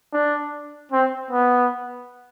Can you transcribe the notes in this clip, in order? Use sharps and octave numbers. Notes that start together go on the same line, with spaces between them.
D4
C4
B3